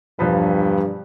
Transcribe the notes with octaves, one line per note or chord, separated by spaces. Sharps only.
E1 G2 F3 B4